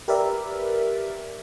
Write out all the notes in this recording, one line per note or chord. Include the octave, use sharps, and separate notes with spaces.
G4 A#4 B4 D5 E5